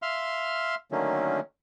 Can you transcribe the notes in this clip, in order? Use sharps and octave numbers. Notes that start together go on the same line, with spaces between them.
E5 F5 C6 F6
D3 D#3 F#3 A3 A#3 C#4